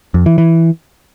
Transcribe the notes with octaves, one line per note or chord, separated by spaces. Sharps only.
F2
E3
E3